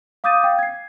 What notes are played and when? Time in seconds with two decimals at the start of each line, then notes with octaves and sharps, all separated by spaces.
0.24 F5 D6 D#6 G6 A6 D#7
0.43 F5 G5
0.59 G#6 C7